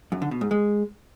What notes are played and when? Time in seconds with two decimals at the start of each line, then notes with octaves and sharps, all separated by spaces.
0.12 F#2
0.22 D3
0.31 B2
0.41 G#2
0.51 G#3